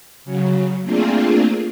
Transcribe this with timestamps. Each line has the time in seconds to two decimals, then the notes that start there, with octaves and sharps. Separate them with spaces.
0.25 C#3 F#3
0.83 A3 A#3 C4 D4 F4 G#4